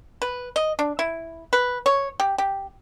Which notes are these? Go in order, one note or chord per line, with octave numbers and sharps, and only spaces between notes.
B4
D#5
D4
E4
B4
C#5
G4
G4